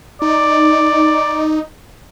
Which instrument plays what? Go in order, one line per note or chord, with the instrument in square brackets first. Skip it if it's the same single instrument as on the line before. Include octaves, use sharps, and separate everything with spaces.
[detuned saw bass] D#4 [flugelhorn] D5